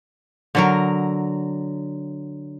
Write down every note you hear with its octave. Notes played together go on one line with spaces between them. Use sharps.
D3 F#3 A#4